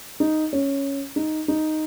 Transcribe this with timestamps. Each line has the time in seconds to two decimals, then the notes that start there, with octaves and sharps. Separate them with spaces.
0.20 D#4
0.53 C#4
1.16 D#4
1.48 D#4